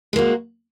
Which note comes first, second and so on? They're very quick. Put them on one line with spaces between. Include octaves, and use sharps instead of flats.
G#3 A#3 F#4